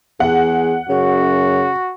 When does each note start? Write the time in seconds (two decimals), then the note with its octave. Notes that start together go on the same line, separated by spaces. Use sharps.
0.20 E2 G#4 F#5
0.89 F#2 C#3 F#4